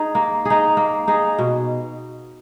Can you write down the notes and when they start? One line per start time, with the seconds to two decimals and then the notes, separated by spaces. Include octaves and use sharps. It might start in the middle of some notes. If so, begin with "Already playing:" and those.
Already playing: D#4 G#4
0.15 A#3
0.45 D#4 G#4
0.77 A#3
1.08 D#4 G#4
1.39 B2